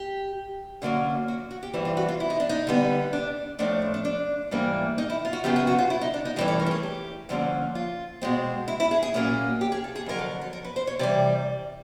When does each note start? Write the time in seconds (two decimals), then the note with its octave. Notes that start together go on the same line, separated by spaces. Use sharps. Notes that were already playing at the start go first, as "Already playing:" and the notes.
Already playing: G4
0.82 F#2 D3 F#3 A#3 C#4
1.28 F#4
1.51 F#4
1.63 G4
1.73 G2 E3 G3 C4 F#4
1.85 F4
1.97 F#4
2.08 F4
2.20 E4
2.30 D#4
2.40 D4
2.49 D#4
2.67 D3 G3 B3
3.13 D4
3.59 A2 F3 A3 D4 D#4
3.82 E4
3.94 D4
4.05 D4
4.51 G#2 E3 G3 A#3 D4
4.98 D#4
5.10 E4
5.25 F4
5.33 F#4
5.44 F#2 C#3 F#3 B3 G4
5.56 G#4
5.67 F#4
5.79 F4
5.90 E4
6.01 D#4
6.14 D4
6.25 D#4
6.36 G2 E3 A3 C#4 G#4
6.48 A4
6.60 A#4
6.66 G4
6.71 G#4
6.83 G4
7.29 G2 D3 F3 A#3 C#4
7.75 F4
8.21 B2 G#3 C4
8.68 E4
8.80 E4
8.91 G#4
9.03 G#4
9.14 A#2 F#3 A#3 C#4 G#4
9.61 G4
9.72 G#4
9.84 A4
9.96 G#4
10.06 F2 D3 F#3 A#4
10.19 A4
10.41 A4
10.53 A#4
10.65 B4
10.76 C5
10.87 C#5
10.99 C3 E3 G3 D5